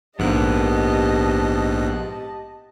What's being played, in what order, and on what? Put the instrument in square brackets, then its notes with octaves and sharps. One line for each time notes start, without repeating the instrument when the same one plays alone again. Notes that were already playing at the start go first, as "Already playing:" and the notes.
[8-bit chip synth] A#1 G#2 F#6 [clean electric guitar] B3 A#4 [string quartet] G4 D#5 A5